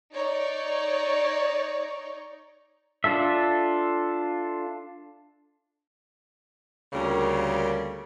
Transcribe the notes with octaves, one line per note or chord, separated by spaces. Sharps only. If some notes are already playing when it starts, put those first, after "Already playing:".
D#4 C#5 D5
D4 F4 A4 E5
D2 C#3 G3 A#3 A#4